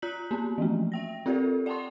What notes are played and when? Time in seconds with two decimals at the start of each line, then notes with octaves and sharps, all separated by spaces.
0.02 F4 A#5 F#6 G6 B6 F#7
0.31 A#3 B3 F4
0.58 E3 F3 A3
0.92 E5 G5 A#6
1.26 C4 F4 G4 A4 A#4 D5
1.66 D5 F#5 G5 A5 C6 C#6